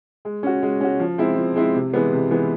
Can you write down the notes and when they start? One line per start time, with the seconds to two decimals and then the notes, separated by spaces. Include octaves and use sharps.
0.25 G#3
0.43 C#4 F#4
0.63 G#3
0.81 C#4 F#4
1.00 F3
1.18 G#3 C4 E4
1.37 F3
1.56 G#3 C4 E4
1.75 C3
1.94 E3 G#3 B3
2.13 C3
2.31 E3 G#3 B3